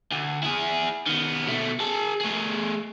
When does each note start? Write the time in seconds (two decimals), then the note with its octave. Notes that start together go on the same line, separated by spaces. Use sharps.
0.11 D2
0.43 E4 G#4
1.06 D#3 B3
1.47 B2 A3
1.80 G#4 A5
2.21 A3 G#4